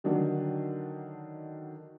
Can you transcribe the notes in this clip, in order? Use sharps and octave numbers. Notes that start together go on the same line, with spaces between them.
D3 D#3 F#3 D4